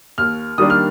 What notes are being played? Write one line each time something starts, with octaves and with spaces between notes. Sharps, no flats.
D#2 F6
D#3 G3 A#3 D4 D#6
F6